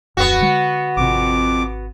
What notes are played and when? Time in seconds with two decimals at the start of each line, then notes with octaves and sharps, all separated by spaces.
0.17 D1 F2 B3 F#4
0.41 D3 G#3
0.97 G#1 F2 C3 D6